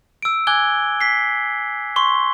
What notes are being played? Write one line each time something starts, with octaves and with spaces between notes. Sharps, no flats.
E6 D7
G#5 D6 E6 F#6 G#6 G7
B6 C7
C6 C#6 G7